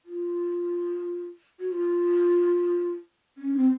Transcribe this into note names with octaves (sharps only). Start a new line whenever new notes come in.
F4
F#4
F4
C#4
C4